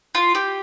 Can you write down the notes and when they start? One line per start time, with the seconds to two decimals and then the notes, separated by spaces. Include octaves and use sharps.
0.15 F4
0.35 G4